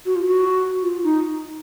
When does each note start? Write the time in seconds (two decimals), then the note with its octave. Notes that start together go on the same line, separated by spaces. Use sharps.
0.06 F#4
0.16 F4
0.25 F#4
0.82 F4
1.04 D#4